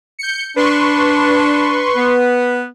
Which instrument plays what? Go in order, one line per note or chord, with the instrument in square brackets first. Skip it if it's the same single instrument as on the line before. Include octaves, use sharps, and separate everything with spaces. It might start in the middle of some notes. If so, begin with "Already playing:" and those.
[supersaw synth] G6 C#7
[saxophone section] D4 [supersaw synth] B4 C6 C#6
[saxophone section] B3